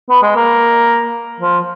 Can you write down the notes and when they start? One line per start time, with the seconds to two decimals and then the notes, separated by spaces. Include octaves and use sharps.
0.10 B3
0.22 G#3
0.36 A#3
1.40 F3